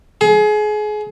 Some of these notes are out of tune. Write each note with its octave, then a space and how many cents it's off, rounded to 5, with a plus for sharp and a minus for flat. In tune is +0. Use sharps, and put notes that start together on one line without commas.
G#4 +30